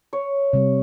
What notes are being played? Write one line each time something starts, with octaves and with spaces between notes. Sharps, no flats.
C#5
C3 G3